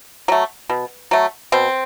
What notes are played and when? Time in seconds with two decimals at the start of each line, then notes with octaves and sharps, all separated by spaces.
0.28 F#3 A3
0.69 B2
1.11 F#3 A3
1.52 B2 C4